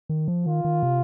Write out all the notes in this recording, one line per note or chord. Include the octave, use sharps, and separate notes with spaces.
D#3
F3
D#3 F4
D#3
C3